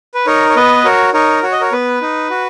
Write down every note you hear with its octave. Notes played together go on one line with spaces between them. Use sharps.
B4
D#4 A#4 C#5
C#5
B3 B4 D#5
F#4 A#4 C#5
D#4 A#4 C#5
F#4 C#5
D#5
A#4 C#5
B3 B4
D#4
F#4